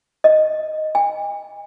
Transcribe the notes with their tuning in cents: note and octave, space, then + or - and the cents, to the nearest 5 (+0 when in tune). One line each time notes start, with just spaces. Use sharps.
D#5 -5
G#5 -45